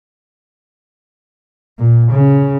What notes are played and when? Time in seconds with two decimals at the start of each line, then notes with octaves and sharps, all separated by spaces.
1.79 A#2
2.12 C#3